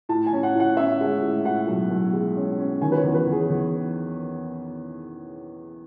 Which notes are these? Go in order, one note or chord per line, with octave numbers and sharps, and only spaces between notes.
A2 A5
G#5
C#4
F#5
A2 F#5
C#4 E5
G#3
A2
A2 F#5
B1
B1
G#3
C#4
C#4
D#3 G#5
B4
C#5
E2
B4
E2
G#4
E2